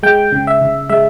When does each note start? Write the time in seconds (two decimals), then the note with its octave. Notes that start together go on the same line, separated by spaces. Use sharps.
0.03 G#3 G5
0.32 C#3
0.47 E5
0.61 C#3
0.89 G#3 E5